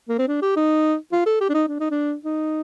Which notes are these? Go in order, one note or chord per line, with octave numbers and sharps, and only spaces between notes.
A#3
C4
D4
G4
D#4
F4
A4
G4
D4
D#4
D4
D#4
D4
D#4